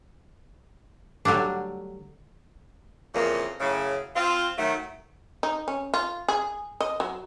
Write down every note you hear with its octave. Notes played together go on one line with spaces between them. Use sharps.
D3 F#3 G3 A3 D4
F2 A#2 C#3 E3 A#3
F#2 A2 C#3
C4 F4
D#3 F#3 A3
D#4
C#4
F4
G#4
D#5
F#3